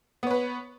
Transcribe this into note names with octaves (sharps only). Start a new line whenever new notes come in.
B3 B4 C#5